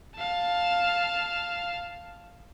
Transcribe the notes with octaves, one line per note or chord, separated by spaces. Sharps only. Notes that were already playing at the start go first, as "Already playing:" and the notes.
F5 A5